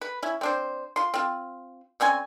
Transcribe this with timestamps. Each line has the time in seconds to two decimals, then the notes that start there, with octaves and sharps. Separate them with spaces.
0.01 B4
0.22 C#4 E4
0.41 C4 D4 C5
0.96 F4 C6
1.14 C4 F4
2.00 D3 C4 C#4 G#5